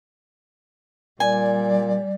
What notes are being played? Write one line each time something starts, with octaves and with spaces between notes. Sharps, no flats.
A#2 G3 D5 G#5